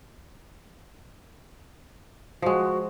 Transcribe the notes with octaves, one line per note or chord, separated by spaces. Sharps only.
F3 G#3 F#4